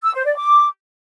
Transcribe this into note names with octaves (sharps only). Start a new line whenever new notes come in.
E6
C5
D5
D6